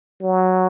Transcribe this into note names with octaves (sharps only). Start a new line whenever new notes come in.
F#3